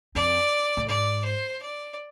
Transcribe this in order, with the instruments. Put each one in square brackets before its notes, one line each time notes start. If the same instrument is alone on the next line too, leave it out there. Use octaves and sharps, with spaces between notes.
[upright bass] F2 [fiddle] D5
[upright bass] A2
[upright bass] G#2 [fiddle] D5
[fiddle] C5
D5